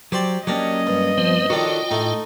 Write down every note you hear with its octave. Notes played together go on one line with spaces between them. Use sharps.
F#3 G4 C5 D5
F#3 A#3 C#4 D4 G4 D#5
G2
F3 B3 C4 C5
D#3 D4 F4 F#4 A4 C#5 G5
A2 A3 D#4